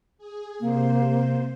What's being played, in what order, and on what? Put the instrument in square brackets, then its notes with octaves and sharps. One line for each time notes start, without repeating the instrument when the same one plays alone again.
[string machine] G#4
[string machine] C3 C5 [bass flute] A#3